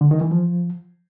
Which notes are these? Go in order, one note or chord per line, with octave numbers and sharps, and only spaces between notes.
D3
D#3
E3
F3